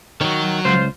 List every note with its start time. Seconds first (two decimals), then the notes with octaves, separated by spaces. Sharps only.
0.21 D#3 F#3 C#5
0.65 C#2 F4 C5